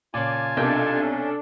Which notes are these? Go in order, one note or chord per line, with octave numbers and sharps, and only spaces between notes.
A#2 C#3 F4 G#5 A5 D6
B1 C3 D4 A4 A#4 D#5 E5 G6
C#4